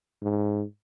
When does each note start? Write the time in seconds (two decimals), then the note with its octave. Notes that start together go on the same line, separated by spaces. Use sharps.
0.23 G#2